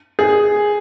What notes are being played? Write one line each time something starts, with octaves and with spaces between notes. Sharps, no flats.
G#4